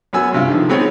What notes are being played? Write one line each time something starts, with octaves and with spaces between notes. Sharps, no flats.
F#2 B3 C#4 F#4 G#5 E6
G2 C3 F4
D3 D#3 F3
G#3 B3 C4 D#4 C#5